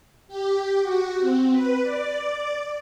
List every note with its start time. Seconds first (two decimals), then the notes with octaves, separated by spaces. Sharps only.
0.28 G4
0.81 F#4
1.19 C4
1.52 B4
1.82 D5